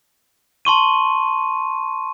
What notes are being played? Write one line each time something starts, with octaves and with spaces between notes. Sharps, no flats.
A5 C6 C#6 D#7